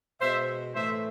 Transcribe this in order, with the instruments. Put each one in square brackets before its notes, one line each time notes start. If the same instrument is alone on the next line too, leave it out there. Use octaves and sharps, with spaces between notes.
[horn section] B2 G#3 C5 E5
A2 E3 A3 C5 E5